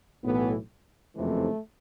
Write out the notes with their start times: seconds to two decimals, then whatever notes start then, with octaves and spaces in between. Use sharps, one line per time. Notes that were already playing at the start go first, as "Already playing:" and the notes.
0.23 B1 A2 E3 B3
1.15 F#1 F2 C3 E3 A3